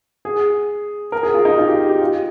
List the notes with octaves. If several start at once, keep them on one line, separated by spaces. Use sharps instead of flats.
G#4
A#4
G#4
F4
D#4
F4
G4
G4
F4